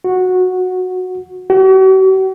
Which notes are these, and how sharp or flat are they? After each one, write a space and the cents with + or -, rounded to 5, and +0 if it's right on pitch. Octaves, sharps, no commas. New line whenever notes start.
F#4 -10
F#4 +45